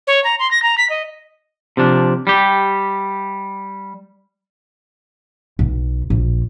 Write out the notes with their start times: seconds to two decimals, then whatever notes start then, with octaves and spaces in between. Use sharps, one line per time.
0.07 C#5
0.24 A#5
0.39 C6
0.51 A#6
0.63 A#5
0.78 B6
0.90 D#5
1.77 C3 F3 D4
2.27 G3 G4
5.59 B1
6.10 A#1